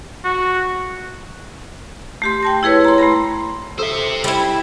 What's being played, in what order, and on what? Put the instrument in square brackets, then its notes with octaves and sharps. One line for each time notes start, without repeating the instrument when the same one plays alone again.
[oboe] F#4
[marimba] A3 G4 C6
G5 A5 A#6
E4 G#4 B4 C#5
A#5 C6
A3 A#5 B5 A#6
[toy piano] A4 E6 [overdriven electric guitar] C5 E5
[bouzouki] G3 E4